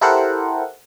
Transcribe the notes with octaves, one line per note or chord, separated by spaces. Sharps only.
E4 G4 A4 A#4 C5 F#5